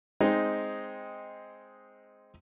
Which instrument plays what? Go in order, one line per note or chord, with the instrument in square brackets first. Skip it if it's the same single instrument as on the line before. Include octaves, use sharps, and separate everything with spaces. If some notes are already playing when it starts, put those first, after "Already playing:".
[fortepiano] G#3 C4 D#4 G5